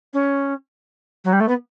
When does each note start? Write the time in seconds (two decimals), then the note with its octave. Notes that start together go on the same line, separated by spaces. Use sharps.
0.13 C#4
1.24 F#3
1.33 G3
1.40 A3
1.48 B3